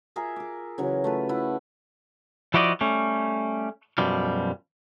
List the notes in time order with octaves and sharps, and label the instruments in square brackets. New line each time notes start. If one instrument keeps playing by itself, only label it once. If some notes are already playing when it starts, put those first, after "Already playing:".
[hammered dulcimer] F4 G#4 A#4 E5
G#4 D6
C#3 E3 F#3
A3 F4 B4
E4 F#5
[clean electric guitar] F3 E4 F#4 G4 D5 D#5
G3 A3 C#4
F#2 B2 F3 G3